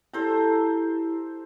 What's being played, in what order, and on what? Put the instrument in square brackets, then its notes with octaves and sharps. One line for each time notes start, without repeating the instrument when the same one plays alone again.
[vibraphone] E4 G4 [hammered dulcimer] A4 C5 A#5